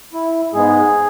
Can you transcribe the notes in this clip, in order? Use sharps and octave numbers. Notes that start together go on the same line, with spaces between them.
E4
G#2 G#3 B3 G#4